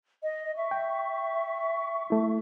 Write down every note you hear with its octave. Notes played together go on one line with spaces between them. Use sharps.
D#5
E5 C#6
G5
A3 E4